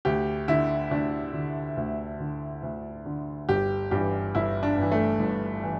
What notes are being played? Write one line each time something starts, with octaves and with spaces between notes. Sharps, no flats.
D2 G4
D3 E4
D2 D4
D3
D2
D3
D2
D3
G1 G4
G2 E3 G4
G1 E4
D4
G2 E3
A3
G1
E3